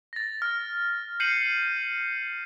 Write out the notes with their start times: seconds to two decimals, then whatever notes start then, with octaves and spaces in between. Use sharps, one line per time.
0.13 A6 A#6
0.42 F6
1.20 G6 C7 C#7 D#7 F#7